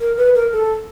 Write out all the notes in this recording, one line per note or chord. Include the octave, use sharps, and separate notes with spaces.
A#4
B4
A#4
A4